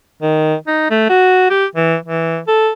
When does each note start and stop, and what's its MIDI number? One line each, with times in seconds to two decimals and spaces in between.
0.22 0.55 51
0.67 0.86 63
0.90 1.07 57
1.09 1.50 66
1.50 1.65 67
1.75 1.97 52
2.06 2.39 52
2.48 2.70 69